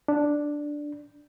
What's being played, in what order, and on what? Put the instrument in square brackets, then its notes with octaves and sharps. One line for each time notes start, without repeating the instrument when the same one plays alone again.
[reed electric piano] D4